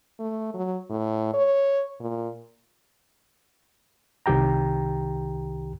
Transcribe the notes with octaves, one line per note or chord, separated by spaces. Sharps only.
A3
F#3
A2
C#5
A#2
C2 D#3 G4 G5 A#5